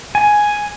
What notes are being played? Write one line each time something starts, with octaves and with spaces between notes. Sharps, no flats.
G#5